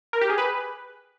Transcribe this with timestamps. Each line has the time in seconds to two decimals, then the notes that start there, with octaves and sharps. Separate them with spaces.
0.13 A#4
0.21 G4
0.30 G#4
0.38 B4